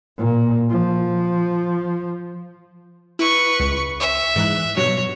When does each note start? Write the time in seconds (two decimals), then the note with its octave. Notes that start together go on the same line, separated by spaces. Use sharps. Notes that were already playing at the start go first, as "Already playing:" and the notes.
0.18 A#2
0.70 F3
3.19 E4 B4 C#6
3.60 C#2
4.00 E5
4.36 G#2 E3 F#6
4.77 G2 B2 F#3 C#5